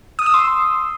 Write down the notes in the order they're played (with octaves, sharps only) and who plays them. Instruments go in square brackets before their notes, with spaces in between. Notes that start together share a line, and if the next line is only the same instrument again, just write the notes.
[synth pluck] D#6
E6
C6